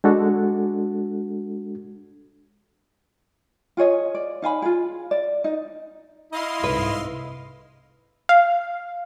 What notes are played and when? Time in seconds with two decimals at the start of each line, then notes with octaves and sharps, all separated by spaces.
0.04 G#3 D4 F#4 A4
3.77 F4 G#4 C#5 D#5
4.15 D5
4.42 D#4 F5 G#5 B5
4.62 F4 G#4
5.11 D5
5.44 D#4
6.32 E4 D#5 F5 C6
6.64 C2 G#2 B4
8.29 F5